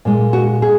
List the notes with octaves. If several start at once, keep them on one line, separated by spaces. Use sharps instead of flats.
A#2 G#3
F#4
G#4